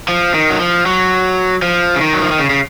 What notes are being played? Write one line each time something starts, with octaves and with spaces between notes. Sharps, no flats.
F3
D#3
F#3
F3
F#3
F3
C#3
D#3
F#3
F3
D#3
C#3
C#3